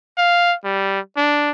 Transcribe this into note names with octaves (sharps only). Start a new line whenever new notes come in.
F5
G3
D4